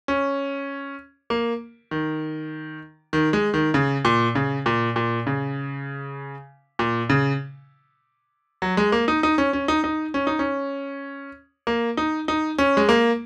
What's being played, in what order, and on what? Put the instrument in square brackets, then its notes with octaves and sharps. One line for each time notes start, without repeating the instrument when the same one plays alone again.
[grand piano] C#4
A#3
D#3
D#3
G#3
D#3
C#3
A#2
C#3
A#2
A#2
C#3
A#2
C#3
F#3
G#3
A#3
D#4
D#4
C#4
C#4
D#4
D#4
C#4
D#4
C#4
A#3
D#4
D#4
C#4
G#3
A#3